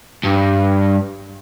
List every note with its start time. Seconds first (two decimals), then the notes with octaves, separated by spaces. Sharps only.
0.24 G2